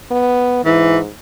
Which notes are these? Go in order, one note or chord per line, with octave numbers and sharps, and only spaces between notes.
B3
G#2 E3